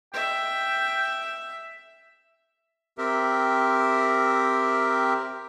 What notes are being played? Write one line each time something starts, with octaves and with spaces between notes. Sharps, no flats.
E5 G5
C4 G4 A#4 E5